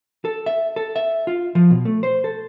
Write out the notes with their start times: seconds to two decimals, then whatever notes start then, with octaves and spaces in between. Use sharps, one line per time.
0.25 A4
0.46 E5
0.76 A4
0.96 E5
1.27 F4
1.55 F3
1.71 B2
1.85 A3
2.03 C5
2.24 A4